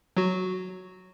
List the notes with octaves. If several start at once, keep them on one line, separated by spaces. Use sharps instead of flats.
F#3 F#4